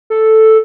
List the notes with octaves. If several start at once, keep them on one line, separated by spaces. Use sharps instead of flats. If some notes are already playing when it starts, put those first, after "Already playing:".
A4